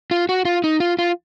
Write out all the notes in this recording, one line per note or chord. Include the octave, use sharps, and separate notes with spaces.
F4
F#4
F4
D#4
F4
F4